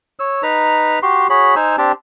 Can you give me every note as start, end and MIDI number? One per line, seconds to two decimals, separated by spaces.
0.19 0.42 73
0.19 0.42 88
0.43 0.99 63
0.43 0.99 71
0.43 0.99 82
1.03 1.27 66
1.03 1.27 67
1.03 1.27 84
1.30 1.55 66
1.30 1.55 68
1.30 1.55 73
1.30 1.55 83
1.56 1.76 63
1.56 1.76 72
1.56 1.76 80
1.56 1.76 88
1.78 1.92 60
1.78 1.92 62
1.78 1.92 67
1.78 1.92 81